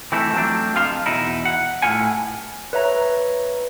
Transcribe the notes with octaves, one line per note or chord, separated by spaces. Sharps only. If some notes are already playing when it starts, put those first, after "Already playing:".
E3 A3 C4 E4 A4
F3 F#3 A3 C4 D4
F2 F3 F4 A4 F5 C6
E2 B2 D#4 E4
F#5
A2 F4 F#5 G#5
B4 C#5 E5 A#5